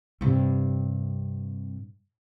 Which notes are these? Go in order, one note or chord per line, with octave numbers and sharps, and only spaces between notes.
G2 C3